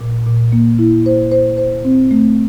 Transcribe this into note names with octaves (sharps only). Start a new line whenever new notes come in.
A#2
A#2
A#3
E4
C5
C5
C5
C4
A3